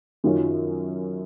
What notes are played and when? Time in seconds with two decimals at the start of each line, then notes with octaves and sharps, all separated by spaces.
0.24 F#2 D#3 F#3 C#4 F4